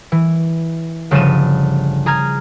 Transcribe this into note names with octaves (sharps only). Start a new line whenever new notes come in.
E3
G1 C#3 F3 D#7 E7
G#4 A#5 F6 G#6